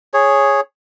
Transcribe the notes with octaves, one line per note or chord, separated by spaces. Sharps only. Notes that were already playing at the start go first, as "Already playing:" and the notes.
G#4 C#5